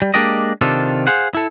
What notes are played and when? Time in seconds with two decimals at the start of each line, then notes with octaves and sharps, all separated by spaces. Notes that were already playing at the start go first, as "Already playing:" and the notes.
0.02 G3
0.14 G#3 A#3 D4 G4 D5 D#5
0.61 C3 D#3 D4 F4 A4
1.07 G#4 C5 F5 F#5
1.35 E4 A4